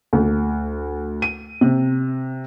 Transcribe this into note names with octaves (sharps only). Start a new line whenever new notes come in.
D2
D#7
C3